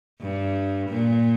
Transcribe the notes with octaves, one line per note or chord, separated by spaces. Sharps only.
G2
A#2